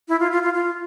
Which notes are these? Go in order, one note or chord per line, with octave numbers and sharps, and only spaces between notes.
E4
F4
F4
F4
F4